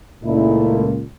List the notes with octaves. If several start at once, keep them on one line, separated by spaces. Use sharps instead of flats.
C#2 A#2 A3 D#4 E4